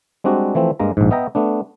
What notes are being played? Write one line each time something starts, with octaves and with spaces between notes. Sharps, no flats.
G3 G#3 C4 D4 F#4
E3 F3 A3 C4
G2 G#3 A#3 A#5
A#1 G#2
B3 D#5 E5 G5 A#5
A3 B3 D4